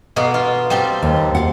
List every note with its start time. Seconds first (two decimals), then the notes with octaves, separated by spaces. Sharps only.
0.16 B2 A#3 B3
0.34 F4
0.70 G3 C4 A5
1.03 D#2
1.35 F5 F#5